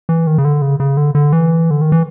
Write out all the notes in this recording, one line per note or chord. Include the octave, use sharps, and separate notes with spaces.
E3
D#3
C#3
D3
C#3
C#3
D3
D3
E3
D3
D#3
E3